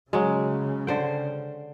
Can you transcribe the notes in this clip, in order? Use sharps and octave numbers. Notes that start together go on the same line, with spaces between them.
C#3 F#3 G#3
D3 C5 G5